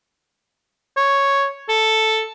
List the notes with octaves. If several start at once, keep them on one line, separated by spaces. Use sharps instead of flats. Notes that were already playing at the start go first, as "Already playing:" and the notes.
C#5
A4